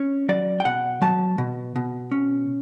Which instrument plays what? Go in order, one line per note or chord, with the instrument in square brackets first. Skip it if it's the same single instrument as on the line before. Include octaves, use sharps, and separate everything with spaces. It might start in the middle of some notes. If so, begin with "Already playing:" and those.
Already playing: [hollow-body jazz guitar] C#4 C#5
F#3 D5
G5
B2 F#5
F#3 A5
B2
B2
C#4